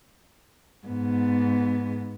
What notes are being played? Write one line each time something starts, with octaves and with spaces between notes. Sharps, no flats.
G#2 B3